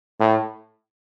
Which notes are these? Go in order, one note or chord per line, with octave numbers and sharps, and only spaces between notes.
A2